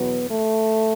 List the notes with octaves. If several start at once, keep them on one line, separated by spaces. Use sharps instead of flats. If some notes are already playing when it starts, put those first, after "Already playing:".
Already playing: E2 B2 F#3 B3
A3